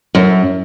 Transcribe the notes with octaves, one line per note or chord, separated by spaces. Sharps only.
F#2